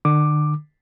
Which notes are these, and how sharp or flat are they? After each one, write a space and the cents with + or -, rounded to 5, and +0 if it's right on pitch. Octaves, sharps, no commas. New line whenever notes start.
D3 +35 D6 +10